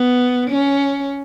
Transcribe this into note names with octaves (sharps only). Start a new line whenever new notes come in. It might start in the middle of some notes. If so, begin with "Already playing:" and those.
Already playing: B3
C#4